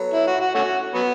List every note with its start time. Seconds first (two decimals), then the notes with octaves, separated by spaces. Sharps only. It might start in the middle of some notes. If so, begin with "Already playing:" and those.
Already playing: F#3 B3 A4 C#5
0.14 E4
0.27 F#4
0.40 F#4
0.55 A3 C#4 F#4
0.94 F#3 B3